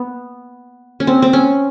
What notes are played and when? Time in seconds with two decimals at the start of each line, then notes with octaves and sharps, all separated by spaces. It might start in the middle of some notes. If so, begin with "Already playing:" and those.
Already playing: B3
1.00 C#4
1.07 C4
1.22 C4
1.33 C#4